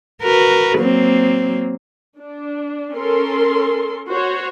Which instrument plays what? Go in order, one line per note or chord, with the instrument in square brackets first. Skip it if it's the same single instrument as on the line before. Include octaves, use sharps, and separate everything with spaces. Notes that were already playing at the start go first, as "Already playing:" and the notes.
[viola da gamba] F#4 A#4 B4
F#3 A#3 C4
[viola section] D4
C#4 A4 A#4 C6
F#4 C5 C#5